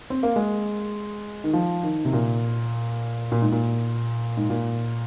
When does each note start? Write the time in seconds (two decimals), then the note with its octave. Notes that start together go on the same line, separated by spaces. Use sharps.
0.10 C4
0.23 A#3
0.36 G#3
1.44 D#3
1.53 F3
1.83 D#3
2.05 C3
2.13 A#2
3.32 A#2
3.42 G#2
3.52 A#2
4.37 G#2
4.50 A#2